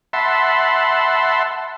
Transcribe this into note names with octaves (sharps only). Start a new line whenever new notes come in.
E5 F#5 A5 B5 C6